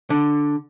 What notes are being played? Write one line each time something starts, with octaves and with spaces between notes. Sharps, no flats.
D3